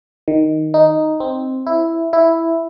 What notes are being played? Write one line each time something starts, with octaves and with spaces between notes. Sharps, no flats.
D#3
D#4
C4
E4
E4